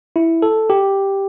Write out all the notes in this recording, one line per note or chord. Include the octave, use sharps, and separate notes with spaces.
E4
A4
G4